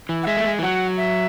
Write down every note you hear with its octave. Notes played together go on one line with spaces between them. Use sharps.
E3
F#5
G#3 E5
A3
G#3
E3
F#3 F#5
E5